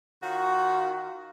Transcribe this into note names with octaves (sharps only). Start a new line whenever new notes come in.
D#3 F4 F#4